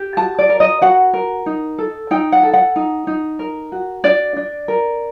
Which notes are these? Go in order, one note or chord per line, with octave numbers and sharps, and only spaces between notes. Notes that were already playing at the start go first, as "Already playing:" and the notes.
Already playing: G4
F#4 A5
D5
A#4
D#5
F#4 F#5
A#4
D#4
A4
D#4 G5
F#5
A4
F#5
D#4
D#4
A#4
F#4
D4 D5
D4
A#4